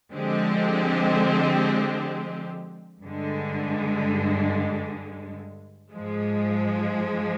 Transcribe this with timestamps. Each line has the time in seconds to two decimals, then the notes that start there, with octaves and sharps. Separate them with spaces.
0.13 D3 F3 G#3 C4 G4
3.03 G2 D3 G#3
5.93 G#2 F3 G#3